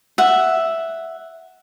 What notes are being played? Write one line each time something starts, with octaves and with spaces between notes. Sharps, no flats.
E5 F#5